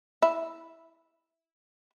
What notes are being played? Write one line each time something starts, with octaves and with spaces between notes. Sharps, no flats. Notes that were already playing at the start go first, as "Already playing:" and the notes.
E4